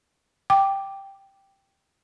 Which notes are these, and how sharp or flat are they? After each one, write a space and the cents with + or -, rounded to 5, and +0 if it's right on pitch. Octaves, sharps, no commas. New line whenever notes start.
G5 +0 D6 +0